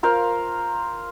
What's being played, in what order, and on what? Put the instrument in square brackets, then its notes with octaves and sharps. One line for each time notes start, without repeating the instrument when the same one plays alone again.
[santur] F4 A#4 C5 F5